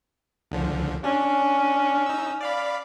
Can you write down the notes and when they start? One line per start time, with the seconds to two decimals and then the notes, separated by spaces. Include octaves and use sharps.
0.51 C#2 D3 F3
1.04 C#4 D4
2.06 D#4 E6
2.41 D5 F5 B5